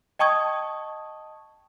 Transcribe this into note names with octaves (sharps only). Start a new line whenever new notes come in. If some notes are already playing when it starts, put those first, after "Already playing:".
D#5 G5 A5 C#6 D#6 G#6